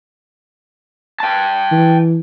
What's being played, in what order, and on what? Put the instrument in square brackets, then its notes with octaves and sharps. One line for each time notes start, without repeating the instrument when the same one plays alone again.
[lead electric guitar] G5 A5
[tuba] E3